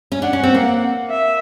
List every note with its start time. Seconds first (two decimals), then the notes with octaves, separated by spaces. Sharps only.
0.12 C#4
0.21 D4 F#5
0.33 C#4
0.43 C4
0.55 A#3
1.10 E5